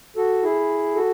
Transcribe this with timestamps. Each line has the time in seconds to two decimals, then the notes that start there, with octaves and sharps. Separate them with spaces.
0.16 F#4 A4
0.43 E4 G#4
0.95 F#4 A4